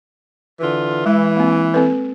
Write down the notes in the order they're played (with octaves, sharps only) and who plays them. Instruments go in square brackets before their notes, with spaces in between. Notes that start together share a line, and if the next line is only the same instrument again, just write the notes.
[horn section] D3 E3 F4
[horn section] E3 [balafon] G#3
[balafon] A#3 C4
C4 A4 B4